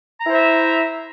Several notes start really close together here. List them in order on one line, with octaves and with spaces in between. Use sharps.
A#5 E4 C5 E5